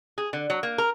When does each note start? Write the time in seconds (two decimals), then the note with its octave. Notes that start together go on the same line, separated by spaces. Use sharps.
0.18 G#4
0.33 D3
0.50 F#3
0.63 A#3
0.78 A#4